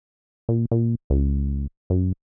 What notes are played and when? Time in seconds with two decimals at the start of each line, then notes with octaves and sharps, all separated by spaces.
0.49 A#2
0.71 A#2
1.10 C#2
1.90 F#2